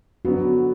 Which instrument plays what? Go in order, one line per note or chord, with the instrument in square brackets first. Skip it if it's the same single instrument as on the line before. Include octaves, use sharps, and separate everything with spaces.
[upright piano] D3 F#3 B3 [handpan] F#4